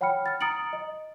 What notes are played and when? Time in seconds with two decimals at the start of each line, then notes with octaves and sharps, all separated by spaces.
0.01 C#5 F#5 G5 B5 F6 C#7
0.26 F6 A6
0.41 A#5 D#6 A6 C#7 D7 F#7
0.73 D#5